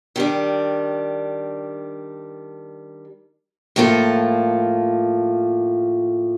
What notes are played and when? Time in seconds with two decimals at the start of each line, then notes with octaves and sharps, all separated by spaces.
0.16 D#3 G3 D4
3.76 A2 F3 A#3 F4 A4